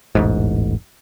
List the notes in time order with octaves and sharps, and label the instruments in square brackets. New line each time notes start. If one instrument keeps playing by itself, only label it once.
[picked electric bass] E1 A1 G#2